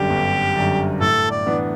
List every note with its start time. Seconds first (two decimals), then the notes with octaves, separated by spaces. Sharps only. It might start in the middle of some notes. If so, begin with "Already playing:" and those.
Already playing: G1 F#2 D3 G3 G4
0.10 G1
0.55 F#2 D3 G3
1.00 A2 A4
1.31 D5
1.46 E3 B3 D4